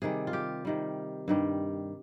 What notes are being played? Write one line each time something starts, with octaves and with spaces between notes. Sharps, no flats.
C3 D#3 G3 G#4
F4
G4
C3 D#3 G3
G2 D#3 G3